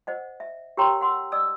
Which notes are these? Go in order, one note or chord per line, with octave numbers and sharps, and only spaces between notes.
C5 D#5 F#5
E5
G4 A#4 C#5 G5 A#5 C6
F#5 C6 E6
D5 D#5 D#6 E6